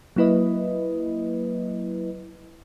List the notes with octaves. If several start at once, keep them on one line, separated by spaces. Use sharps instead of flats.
F#3 A#3 E4 B4 D#5